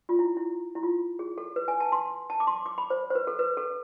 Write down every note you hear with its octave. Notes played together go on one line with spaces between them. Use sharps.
F4
E4
E4
E4
F4
G#4
A4
B4
G#5
A5
C6
A5
D6
C6
D6
B5
C5
C5
B4
A4
B4
A4